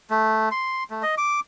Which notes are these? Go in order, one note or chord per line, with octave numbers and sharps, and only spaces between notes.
A3
C6
A3
D#5
D6